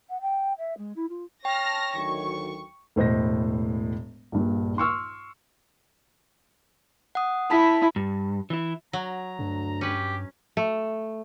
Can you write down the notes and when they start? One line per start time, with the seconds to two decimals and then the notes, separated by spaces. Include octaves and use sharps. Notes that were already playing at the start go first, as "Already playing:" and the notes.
0.09 F#5
0.21 G5
0.58 E5
0.77 G#3
0.96 E4
1.09 F4
1.45 C#5 G5 A5 F6 A#6
1.95 D2 D#3 F#3 C#6
2.96 E1 A2 C5 D#5 A#6
4.32 A#1 G2 A#2
4.78 C6 C#6 E6 F6
7.15 F#5 D#6
7.51 E4 A5 B5 B6
7.96 G2
8.50 E3 E4
8.93 F#3 A#5
9.39 D2 G2
9.81 C#4 G4 B4
10.57 A3